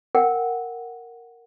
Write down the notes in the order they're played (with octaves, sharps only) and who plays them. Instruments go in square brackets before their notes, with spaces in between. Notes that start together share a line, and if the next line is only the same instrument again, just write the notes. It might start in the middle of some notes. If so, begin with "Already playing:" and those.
[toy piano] A#4 F#5 G5